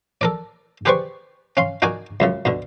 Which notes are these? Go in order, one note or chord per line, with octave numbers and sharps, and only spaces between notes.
A4 A#4 D5
G4 G#4 B4 C5 D5 C#6
C#4 F5 C6
D#4 F#4 A#4 D5 G#5
C#2 F#2 C#3
D2 B2 D3